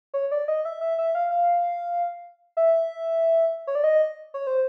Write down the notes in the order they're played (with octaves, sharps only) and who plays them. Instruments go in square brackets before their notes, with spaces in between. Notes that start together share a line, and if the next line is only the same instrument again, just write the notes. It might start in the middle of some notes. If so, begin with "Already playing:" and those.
[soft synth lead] C#5
D5
D#5
E5
E5
E5
F5
F5
E5
C#5
D5
D#5
C#5
C5